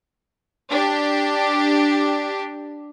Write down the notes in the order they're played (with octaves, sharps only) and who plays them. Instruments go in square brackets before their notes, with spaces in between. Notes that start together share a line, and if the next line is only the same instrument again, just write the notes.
[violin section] D4 G4